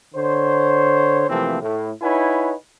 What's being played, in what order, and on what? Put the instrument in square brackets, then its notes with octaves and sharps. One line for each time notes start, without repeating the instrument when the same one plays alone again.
[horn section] D3 C5 C#5
C3 E3 F3 A3 A#3 C4
A2
D#4 E4 B4 C#5 F#5 G#5